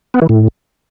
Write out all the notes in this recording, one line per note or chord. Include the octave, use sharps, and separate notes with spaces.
B3
E3
A2